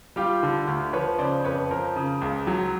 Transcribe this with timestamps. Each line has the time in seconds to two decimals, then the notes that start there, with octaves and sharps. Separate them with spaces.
0.16 G3 F4 G4
0.43 D3
0.67 D2
0.93 F3 B4 C#5
1.19 C#3 C5 D5
1.44 F2 B4 C#5
1.71 F3 A#4 C5
1.96 C#3
2.21 C#2
2.47 F#3